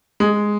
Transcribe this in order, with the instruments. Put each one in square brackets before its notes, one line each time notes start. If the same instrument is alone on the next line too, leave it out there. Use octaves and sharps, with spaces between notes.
[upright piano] G#3